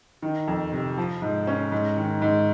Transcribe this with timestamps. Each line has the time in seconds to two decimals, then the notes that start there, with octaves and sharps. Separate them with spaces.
0.22 D#3
0.47 F2
0.72 C3
0.98 F3
1.22 G#2
1.47 C#4
1.72 G#2
1.97 D#3
2.22 G#2